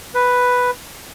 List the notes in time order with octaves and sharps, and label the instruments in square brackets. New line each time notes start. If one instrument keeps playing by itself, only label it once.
[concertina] B4